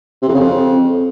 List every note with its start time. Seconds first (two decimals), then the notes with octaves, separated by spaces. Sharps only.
0.22 C3
0.28 F2
0.34 C#3
0.40 F2